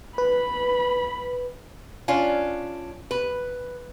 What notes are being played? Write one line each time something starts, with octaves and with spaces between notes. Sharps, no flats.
B4 B5
C#4 D4 F4
B4